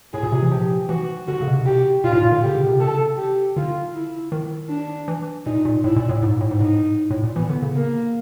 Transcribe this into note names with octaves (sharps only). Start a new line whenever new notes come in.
A2 G#4
A#2
C3
E3
F3 G4
E3 F#4
D3 F#4
C#3
B2
C3
C3 G4
A#2 F4
A2
A#2
D3
C#3 G4
D3
C3
C#3 A4
G4
D3 F4
E4
D#3
D4
E3
A#2 D#4
A#2
A2 E4
A#2
A2
G#2
A2
G#2
A2 D#4
A2
A#2
E3 B3
D3
C#3
A#3